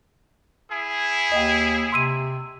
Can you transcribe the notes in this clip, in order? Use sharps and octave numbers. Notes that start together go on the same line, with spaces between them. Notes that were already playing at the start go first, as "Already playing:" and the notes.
E4 G#4
D#2 D#5 G5
C3 C6 E6 D#7